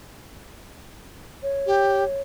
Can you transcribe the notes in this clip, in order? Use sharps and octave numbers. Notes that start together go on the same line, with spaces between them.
C#5
G4